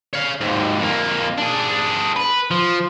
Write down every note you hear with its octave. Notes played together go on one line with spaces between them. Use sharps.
C#5 F5
D#2 G#2
F2 A#3
D4 G#4
B4
F3